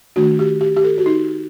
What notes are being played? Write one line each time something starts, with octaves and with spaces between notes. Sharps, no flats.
D#3 A3 D4 F#4
G4
G4
G4
A4
F#4
D#4